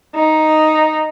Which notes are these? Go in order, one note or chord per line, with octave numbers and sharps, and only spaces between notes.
D#4